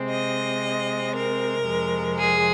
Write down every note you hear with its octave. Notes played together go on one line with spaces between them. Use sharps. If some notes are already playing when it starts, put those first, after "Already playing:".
Already playing: C3 G#3 C4
D#5
A#4
F2 C3 G#3
G#4